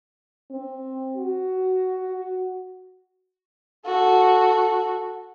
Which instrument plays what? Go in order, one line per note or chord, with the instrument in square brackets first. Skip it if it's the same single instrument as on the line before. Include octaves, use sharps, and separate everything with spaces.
[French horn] C4
F#4
[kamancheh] F#4 A4